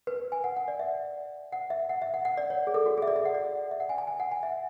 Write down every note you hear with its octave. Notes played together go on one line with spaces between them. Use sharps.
B4
G#5
F#5
F#5
D5
E5
F#5
E5
F#5
E5
F#5
F#5
D5
C#5
G#4
A4
F#4
G#4
E5
D5
E5
F#5
D5
E5
F#5
G#5
A5
G#5
F#5
G#5
E5